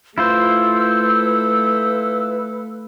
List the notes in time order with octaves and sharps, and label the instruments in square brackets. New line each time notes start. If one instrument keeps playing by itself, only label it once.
[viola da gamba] A3 [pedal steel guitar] E4 F4 C5 [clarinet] B4 [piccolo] E6